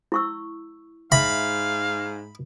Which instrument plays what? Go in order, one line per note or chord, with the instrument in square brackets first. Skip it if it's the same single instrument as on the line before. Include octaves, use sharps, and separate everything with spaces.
[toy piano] E4 C#6 E6
[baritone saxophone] G#2 [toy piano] E5 [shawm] F5 [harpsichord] B5